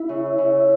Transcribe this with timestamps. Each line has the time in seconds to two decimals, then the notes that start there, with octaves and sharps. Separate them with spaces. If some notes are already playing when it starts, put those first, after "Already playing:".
Already playing: E4
0.09 C#3
0.38 C#3